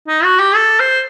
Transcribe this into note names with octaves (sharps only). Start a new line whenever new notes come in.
D#4
F#4
G4
A4
C5